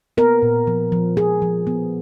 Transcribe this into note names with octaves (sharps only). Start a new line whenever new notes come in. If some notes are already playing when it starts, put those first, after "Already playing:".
B3 A#4
A#2
F3
F3
F3 G#4
F3
B3